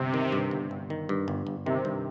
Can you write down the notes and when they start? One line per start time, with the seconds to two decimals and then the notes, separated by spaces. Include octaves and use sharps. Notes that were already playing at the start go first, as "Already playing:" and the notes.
Already playing: G1 C3
0.14 D#3
0.32 G2
0.51 G1
0.71 G1
0.90 D#3
1.09 G2
1.28 G1
1.47 G1
1.66 C3 D#3
1.85 G2